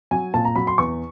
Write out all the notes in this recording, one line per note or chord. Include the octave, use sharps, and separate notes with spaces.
F#3 G#5
A#2 A5
A#5
F#3 B5
C6
E2 C#6